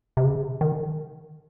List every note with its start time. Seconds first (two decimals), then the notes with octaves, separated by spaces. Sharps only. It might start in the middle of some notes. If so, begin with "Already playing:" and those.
0.17 C3
0.24 C#3
0.61 D#3